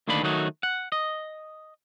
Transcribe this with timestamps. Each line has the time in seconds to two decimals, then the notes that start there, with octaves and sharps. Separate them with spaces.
0.08 D2 D#3 A#3 D4 D#4 B5
0.23 D#3 F#3 A3 D#4 F#4
0.63 F#5
0.92 D#5